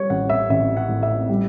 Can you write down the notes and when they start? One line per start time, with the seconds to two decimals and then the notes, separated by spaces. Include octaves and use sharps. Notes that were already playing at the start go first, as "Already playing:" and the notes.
Already playing: G3 C#5
0.10 A1 F#5
0.30 E5
0.49 A1 E5
0.77 F#5
0.89 A2
1.03 E5
1.29 G3